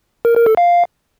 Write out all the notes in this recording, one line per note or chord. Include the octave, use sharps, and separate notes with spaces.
A#4
A#4
A4
F5